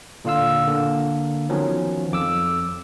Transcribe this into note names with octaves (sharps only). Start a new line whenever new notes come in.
A#2 D3 F4 F5 E6
D3 A#3
D#3 F3 F#3 B3 C#4
F2 D6 E6